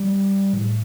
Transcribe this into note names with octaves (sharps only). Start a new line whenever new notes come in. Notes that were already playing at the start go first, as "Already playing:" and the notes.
Already playing: G3
A2